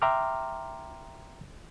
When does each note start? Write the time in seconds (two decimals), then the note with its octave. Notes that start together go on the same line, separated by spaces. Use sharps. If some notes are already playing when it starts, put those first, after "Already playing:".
0.02 E5 G5 A#5 C6 D6 F6